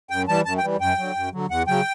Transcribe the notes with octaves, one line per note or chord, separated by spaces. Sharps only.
F#2 G5
E3 G3 A5
F#2 A5
G5
E3 G3
F#2 G5
D3 F#3
F#2
D3 F#3
E2 F#5
C#3 F#3 G5